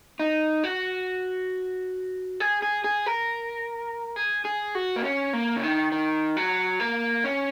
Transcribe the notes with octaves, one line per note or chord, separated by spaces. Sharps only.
D#4
F#4
G#4
G#4
G#4
A#4
G#4
G#4
F#4
A#3
C#4
A#3
C#3
D#3
D#3
F#3
A#3
C#4